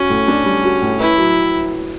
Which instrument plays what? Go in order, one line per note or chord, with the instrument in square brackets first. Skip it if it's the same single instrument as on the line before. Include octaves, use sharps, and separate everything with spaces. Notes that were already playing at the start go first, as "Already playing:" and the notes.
Already playing: [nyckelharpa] C#4 [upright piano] F#4
[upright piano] A2
D4
G3
F#4
A2
[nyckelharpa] E4 [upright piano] B4
[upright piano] F#3